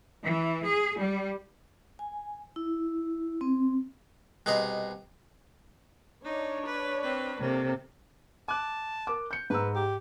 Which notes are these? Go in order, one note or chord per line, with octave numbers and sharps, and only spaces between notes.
E3
G#4
G3
G#5
E4
C4
C2 B2 G#4 D#5 A#5 C6
D4 D#4 C#5
B4
C4 B4
C3 A#3 A4
A5 D6 F#6
A#4 D6
G6 C#7
G#2 B4 A#5 E6
G4